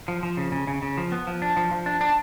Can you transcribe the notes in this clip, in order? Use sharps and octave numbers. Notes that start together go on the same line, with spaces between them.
F3
F3
C#3
C#3
C#3
C#3
F3
B3
F3
D4
F3
F3
D4
D4